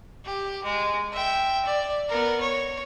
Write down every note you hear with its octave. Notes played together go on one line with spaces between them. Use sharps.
G4
G#3
E5 G5
D5
B3 A#4
C#5